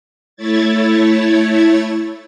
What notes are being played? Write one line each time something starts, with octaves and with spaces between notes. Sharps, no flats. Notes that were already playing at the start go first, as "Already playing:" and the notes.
A3 E4 C#5 G#6 A6